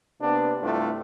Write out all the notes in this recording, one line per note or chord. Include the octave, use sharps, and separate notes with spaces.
C3 A#3 B3 D4
G2 C3 A3 D4 E4 F4